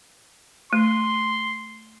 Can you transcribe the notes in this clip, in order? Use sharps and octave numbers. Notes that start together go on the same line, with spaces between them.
A3 C6